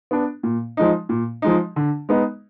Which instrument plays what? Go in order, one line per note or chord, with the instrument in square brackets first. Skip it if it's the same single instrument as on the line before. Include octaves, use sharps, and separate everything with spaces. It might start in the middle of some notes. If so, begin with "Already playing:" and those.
[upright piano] B3 D4
A#2
F3 G#3 D#4
A#2
F3 G#3 D#4
D3
G#3 B3 D#4